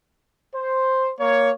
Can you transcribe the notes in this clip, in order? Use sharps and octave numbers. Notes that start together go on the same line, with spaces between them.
C5
A#3 C#5